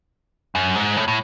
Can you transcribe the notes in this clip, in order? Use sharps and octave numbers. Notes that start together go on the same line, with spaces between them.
F#2
G#2
A2
A2